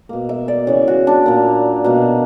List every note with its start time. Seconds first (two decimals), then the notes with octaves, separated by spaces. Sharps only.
0.09 B2 A#3
0.29 E5
0.48 D5
0.67 C#3 E3 B3 C#5
0.88 F#4
1.07 D4
1.26 A#2 A#3
1.84 B2 A#3